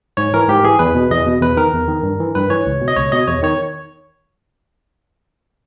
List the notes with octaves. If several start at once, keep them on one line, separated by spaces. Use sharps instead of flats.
G#2 C#5
E3 A#4
G#2 G4
E3 G#4
E2 B4
B2
E2 D#5
B2
E2 B4
D#3 A#4
E2
D#3
G2
E3
G2 B4
E3 C#5
C#2
B2
D#5
C#2 C#5
B2 D#5
E2 C#5
D#3 C#5